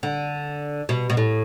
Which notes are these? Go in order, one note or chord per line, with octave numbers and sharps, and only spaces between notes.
D3
B2
B2
A2